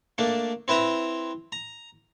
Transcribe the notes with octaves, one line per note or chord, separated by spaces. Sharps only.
A3 A#3 D4
C4 E4 B4 E5 A#5
A#5